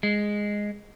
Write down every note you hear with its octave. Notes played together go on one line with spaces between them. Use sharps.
G#3